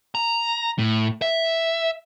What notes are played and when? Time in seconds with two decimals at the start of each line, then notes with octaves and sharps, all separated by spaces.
0.15 A#5
0.79 A2
1.22 E5